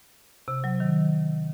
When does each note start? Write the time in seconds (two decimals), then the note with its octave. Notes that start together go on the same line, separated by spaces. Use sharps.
0.48 C3
0.64 F#3
0.80 D#3